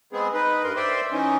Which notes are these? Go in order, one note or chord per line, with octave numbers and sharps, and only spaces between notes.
G#3 B3 C4 G#4
D#4 B4
G2 A#4 C6
C5 D5 E5 G5 C6
E3 C#4 D#4